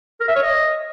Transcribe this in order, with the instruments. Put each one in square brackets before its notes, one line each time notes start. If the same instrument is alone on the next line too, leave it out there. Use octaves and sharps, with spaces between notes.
[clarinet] A#4
E5
C#5
D#5